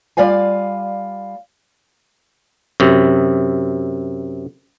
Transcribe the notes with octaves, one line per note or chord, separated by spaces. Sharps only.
G3 F4 D5 F5 G#5
F#2 C3